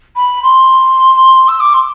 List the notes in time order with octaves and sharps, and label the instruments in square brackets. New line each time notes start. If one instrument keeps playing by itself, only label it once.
[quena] B5
C6
E6
D6
C6